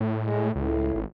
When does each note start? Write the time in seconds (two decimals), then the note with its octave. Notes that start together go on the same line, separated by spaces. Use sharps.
0.01 A2
0.23 G#3
0.56 C#2 A2
0.95 G#1